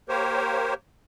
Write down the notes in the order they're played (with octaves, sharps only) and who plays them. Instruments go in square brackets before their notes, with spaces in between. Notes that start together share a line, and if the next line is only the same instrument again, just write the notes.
[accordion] A#3 G4 A#4 C5 C#5